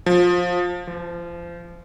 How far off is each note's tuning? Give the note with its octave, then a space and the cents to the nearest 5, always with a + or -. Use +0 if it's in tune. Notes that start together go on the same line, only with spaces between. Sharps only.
F3 +20
F3 -30